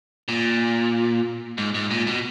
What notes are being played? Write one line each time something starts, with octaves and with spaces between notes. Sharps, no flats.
A#2
G#2
G#2
A#2
B2